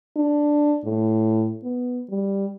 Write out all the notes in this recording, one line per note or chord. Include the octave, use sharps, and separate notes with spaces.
D4
A2
B3
G3